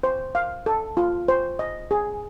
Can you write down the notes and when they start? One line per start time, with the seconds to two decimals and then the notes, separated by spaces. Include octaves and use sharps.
0.03 C5
0.35 F5
0.66 A4
0.97 F4
1.28 C5
1.59 D#5
1.91 G#4